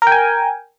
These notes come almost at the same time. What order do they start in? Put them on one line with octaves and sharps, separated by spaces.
A#4 G5 G#5